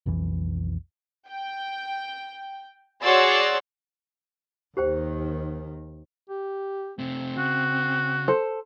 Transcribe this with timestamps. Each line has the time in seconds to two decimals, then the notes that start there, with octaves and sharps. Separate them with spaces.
0.06 B1 F2 E3
1.28 G5
3.03 F#4 G#4 C#5 D5 C6 E6
4.77 D#2 D#3 G4 C5 G5
6.29 G4
6.99 C3 A3 C4
7.38 C#3 F#4
8.28 A4 C5